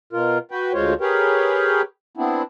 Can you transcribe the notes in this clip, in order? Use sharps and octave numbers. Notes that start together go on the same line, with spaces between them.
B2 F4 A#4
F#4 B4 G5
D2 G#3 F4 C5 C#5
G4 G#4 A#4 B4 C#5 G5
B3 C4 D4 E4